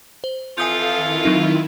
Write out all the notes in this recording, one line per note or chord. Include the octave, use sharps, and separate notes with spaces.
C5
F2 E3 F4 A4 F5 G#5 D#6 G6
D#3 E4
F#3 C4 D#4